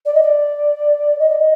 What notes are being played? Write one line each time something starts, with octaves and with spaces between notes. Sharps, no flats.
D5
D#5
D5
D#5
D5
D#5